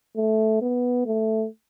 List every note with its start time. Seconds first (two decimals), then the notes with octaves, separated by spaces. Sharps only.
0.16 A3
0.61 B3
1.06 A3